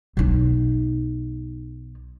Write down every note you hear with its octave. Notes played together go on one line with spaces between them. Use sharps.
B1 D#4